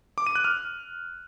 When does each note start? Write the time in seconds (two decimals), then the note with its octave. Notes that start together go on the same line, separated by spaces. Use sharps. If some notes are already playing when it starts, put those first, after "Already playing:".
0.18 D6
0.27 D#7
0.35 F#6
0.44 F6